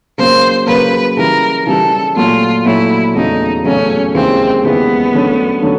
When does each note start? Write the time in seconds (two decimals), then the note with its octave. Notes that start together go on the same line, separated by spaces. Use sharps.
0.17 C#3 F#3 A#3 C5
0.66 C#3 F#3 A#3 B4
1.17 C#3 E3 G3 A#4
1.66 C#3 E3 G3 A4
2.15 A#2 F#3 A3 F4
2.65 A#2 F#3 A3 E4
3.14 E2 C#3 F#3 A3 D#4
3.64 E2 C#3 F#3 A3 C#4
4.14 D#2 C#3 E3 G#3 C4
4.63 D#2 C#3 E3 G#3 B3
5.14 D3 F#3 A3 C#4
5.62 D3 F#3 A3 C#4